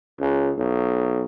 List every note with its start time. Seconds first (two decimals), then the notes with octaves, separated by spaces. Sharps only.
0.20 C#2
0.58 B1